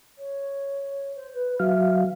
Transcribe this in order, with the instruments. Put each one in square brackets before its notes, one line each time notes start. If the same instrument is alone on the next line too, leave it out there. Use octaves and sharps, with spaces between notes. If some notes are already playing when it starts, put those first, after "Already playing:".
[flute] C#5
C5
B4
[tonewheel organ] F#3 F5 [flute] E5